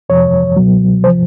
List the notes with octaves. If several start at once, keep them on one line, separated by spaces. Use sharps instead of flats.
F2 C3 F3 C#5
C#2 B2 F#3
C3 F3 C5